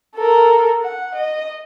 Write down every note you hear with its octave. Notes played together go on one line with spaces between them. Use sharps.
A4 A#4
F#5
D#5